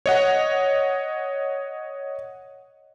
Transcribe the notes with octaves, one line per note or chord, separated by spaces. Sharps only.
C#5 D#5 F#5